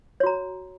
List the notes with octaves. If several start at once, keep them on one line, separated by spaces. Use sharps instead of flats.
F#4 C#5 A#5